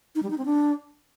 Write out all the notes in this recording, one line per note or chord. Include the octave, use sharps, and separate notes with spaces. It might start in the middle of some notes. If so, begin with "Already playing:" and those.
D#4
G3
D#4
C4
D4